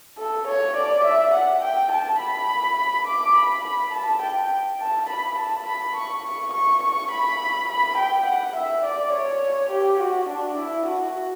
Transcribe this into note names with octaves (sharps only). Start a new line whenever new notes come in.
A4
C#5
D5
E5
F#5
G5
A5
B5
D6
B5
B5
A5
G5
A5
B5
A5
B5
C#6
C#6
C#6
C#6
B5
B5
G5
F#5
E5
D5
C#5
G4
F#4
D4
E4
F#4